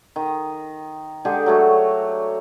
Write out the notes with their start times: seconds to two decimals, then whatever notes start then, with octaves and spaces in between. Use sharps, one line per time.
0.16 D#3
1.25 D3 G#3 G4 G#4
1.46 F#3 A3 C#5